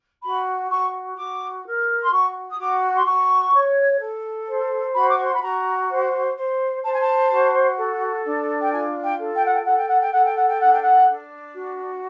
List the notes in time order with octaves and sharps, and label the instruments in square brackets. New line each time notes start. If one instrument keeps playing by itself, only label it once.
[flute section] F#4 B5
F#4 C#6
F#4 D6
A#4
C6
F#4 C#6
D#6
F#4 D6
C6
F#4 C#6
C#5
A4
C5
F#4 B5
D6
C#6
C6
B5
F#4 A#5
C5
C5
C5 A5
G#5
A5
F#4
A4
D4
G5
F4 G#5
G5
A4
G5
F#5
G5
A4 F#5
G5
F#5
G5
A4 F#5
G5
F#5
G5
D4 F#5
G5
F#5
D4
F#4